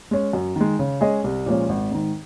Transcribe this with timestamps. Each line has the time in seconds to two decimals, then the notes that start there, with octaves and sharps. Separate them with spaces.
0.11 G#3 C#4
0.33 F#2
0.56 D#3 G#3
0.79 C#3
1.01 G#3 C#4 G#4 D#5
1.24 C2
1.46 A#2 F3 G#3 C#4
1.69 G#1
1.91 G#2 D#3